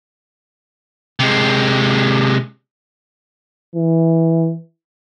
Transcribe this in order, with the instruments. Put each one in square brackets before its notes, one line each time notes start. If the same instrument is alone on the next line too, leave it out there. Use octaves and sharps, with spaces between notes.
[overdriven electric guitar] C3 G#3
[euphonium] E3